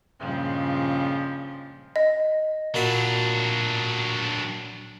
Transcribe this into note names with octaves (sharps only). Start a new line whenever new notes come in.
G2 A#2 C#3 F3 G3 G#3
D#5
A#2 F#3 D4 F#4 B5